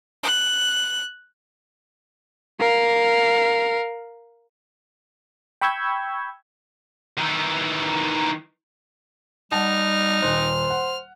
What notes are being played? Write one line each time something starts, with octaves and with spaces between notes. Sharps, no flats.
F#6
A#4 F5
G5 B5 C#6 E6 G6 G#6
D#3 E3
G3 D#4 F#5 A5 F6
D#1 C5 F#6
F#5